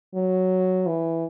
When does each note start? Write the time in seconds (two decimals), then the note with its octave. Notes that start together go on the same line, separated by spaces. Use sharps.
0.15 F#3
0.87 E3